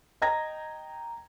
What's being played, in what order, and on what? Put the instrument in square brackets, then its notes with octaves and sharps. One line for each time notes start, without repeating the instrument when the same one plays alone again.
[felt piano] D#5 G5 A#5 G#6 A#6